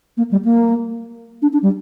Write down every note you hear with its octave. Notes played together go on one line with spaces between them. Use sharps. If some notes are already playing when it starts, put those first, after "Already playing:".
A#3
G3
A#3
D4
D4
G3